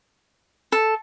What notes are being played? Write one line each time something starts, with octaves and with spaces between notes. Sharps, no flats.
A4